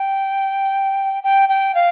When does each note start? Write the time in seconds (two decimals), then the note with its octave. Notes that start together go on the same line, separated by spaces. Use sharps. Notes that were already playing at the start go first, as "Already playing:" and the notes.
Already playing: G5
1.24 G5
1.49 G5
1.75 F5